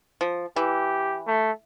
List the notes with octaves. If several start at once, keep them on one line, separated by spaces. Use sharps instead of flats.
F3
E3 G4
A3